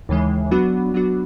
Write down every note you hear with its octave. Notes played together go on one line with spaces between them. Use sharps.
D#2 C#3 E3 G#3
F#3 B3 D4 F#4
F#3 B3 D4 F#4